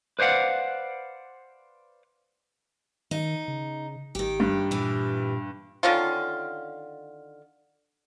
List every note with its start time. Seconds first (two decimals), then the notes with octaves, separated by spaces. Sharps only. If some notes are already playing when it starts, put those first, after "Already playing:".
0.19 B4 C5 D5 F5 F#5
3.11 D#3 D#4
3.48 C#3
4.15 G#1 D#3 G4
4.40 G2
4.71 A#2 E3 G4
5.83 D3 D#3 C#4 F4